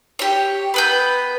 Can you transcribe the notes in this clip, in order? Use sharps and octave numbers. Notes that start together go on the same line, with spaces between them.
G4 C#5
B3 B4 G6